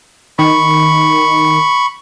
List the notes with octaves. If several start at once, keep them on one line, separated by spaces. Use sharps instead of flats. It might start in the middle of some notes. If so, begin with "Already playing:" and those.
D#3 B5 C#6